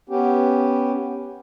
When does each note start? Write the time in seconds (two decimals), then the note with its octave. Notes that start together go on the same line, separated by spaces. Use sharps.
0.09 B3 C#4 G4